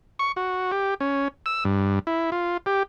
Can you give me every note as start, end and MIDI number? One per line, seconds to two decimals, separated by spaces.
0.19 0.32 85
0.36 0.71 66
0.72 0.94 67
1.00 1.28 61
1.46 1.64 88
1.65 1.99 43
2.07 2.30 64
2.32 2.57 65
2.66 2.83 67